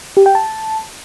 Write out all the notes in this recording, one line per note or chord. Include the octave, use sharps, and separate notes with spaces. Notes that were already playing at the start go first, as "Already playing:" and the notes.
G4
G5
A5